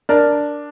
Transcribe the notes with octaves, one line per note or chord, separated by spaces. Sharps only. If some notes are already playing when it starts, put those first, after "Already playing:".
D4 A#4 D5